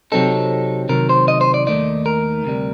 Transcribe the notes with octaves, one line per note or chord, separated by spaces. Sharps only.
C3 F#3 C4 D#4 A4
C3 D#3 F#3 A#4
C5
D#5
C5
D5
D#2 D#3 A3 D#4 D5
A#4
D2 C3 G3